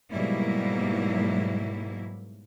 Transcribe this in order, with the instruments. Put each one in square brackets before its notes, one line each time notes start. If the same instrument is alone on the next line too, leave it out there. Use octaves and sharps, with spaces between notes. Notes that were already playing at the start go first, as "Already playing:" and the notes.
[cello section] G#2 B2 F#3 G3 A#3 E4